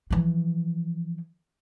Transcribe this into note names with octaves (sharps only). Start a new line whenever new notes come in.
E3 F3